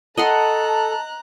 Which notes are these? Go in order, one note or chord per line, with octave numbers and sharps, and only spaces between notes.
A4 D#5 F#5 A5 A#5 C6 F#6